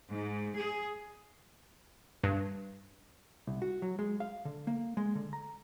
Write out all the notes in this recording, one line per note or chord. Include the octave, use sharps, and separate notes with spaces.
G#2
G#4
G2
C2
F#4
F#3
G#3
F5
D3
A#3
G#3
D3
A#5